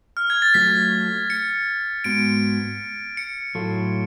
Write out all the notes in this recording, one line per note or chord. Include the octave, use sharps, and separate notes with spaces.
F6
G#6
A6
F#3 A3 F4 B6
C#7
G#2 G#3 B3 F#4 D7
C#7
A2 F#3 A3 F4 A4